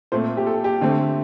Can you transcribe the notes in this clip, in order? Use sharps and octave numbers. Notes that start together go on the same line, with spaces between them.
A#2 A3 C4 C5
G4
A4
G4
D3 A3 C4